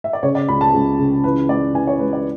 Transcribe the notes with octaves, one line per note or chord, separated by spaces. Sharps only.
E5
D5
C#3 C#5
D5
C#2 B5
A5
C#2
C#3
E3 B4
G#3 D5
E3 G#5
C#5
G#3 B4
D5